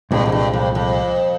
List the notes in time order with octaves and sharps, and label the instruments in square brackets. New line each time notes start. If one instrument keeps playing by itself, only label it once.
[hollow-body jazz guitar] C2 A#2 G#3 C4 [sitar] G2
[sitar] F2
G2
F2
F2